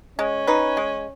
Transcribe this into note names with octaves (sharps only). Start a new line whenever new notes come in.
G#3 C#4
D#4 B4
G#3